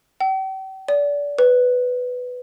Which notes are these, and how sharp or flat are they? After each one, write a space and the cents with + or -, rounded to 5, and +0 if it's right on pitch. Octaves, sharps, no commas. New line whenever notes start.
G5 -40
D5 -30
B4 +10